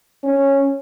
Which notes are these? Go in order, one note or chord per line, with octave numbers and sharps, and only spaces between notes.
C#4